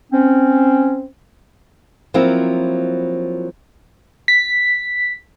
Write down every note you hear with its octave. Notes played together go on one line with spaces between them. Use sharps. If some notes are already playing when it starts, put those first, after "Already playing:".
C4 C#4
F3 F#3 A#3 C4 E4
B6